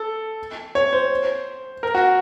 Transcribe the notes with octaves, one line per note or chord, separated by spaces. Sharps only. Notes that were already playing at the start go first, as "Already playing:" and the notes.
Already playing: A4
C#5
C5
A#4
F#4